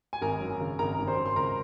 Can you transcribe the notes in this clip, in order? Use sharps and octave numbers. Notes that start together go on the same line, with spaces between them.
G#5
G#1 A#4 A#5
F#2
C#3
G#1 A#4 A#5
G#1
C5 C6
F#2
C6
C#2 A#4 A#5